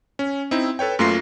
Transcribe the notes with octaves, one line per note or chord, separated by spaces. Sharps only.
C#4
C4 D#4 E4
A4 B4 C#5 G5
F#2 A3 A#3 F4 A#6 C7